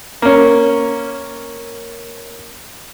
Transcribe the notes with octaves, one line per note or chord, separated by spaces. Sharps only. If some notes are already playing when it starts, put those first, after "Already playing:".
A#3 C#4